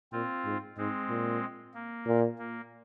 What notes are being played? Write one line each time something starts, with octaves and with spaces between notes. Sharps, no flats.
A#2 C4 F4
G#2
G#2 G#3 C4
A#2
A#3
A#2
A#3